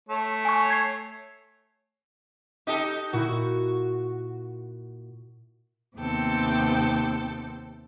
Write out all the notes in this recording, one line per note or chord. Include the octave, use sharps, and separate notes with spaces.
A3 C#5
G#5 C#6
G#6 C7
D#4 G4 A4 D#6 F#6
A#2 E4 F#4
D#2 C3 B3 C4 A4 G5